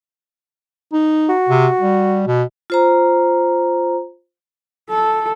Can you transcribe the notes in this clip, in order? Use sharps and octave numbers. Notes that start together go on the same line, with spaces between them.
D#4
F#4
C3
G3
B2
F4 C5 A#5
A4